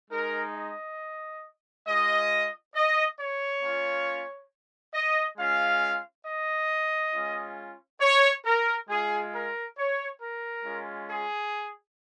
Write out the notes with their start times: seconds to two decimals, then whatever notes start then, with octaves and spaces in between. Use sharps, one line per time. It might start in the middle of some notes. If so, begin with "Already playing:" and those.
0.11 G#3 D#4 A#4
0.55 D#5
1.87 G#3 F4 D#5
2.75 D#5
3.18 C#5
3.62 A#3 C#4 F4
4.94 D#5
5.37 G#3 C#4 F4 F5
6.25 D#5
7.14 G#3 C#4 F4
8.01 C#5
8.45 A#4
8.89 G#3 F4 G#4
9.33 A#4
9.77 C#5
10.20 A#4
10.65 G#3 C#4 F4
11.09 G#4